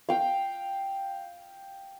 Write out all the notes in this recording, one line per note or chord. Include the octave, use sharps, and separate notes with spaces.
F5 G5